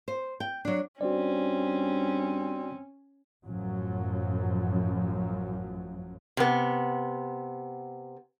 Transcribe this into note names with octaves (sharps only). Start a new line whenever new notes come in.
C5
G5
F#3 D4
G2 C4 C#4 F#4 C5 D5
A1 F#2 F3 F#3
C3 B3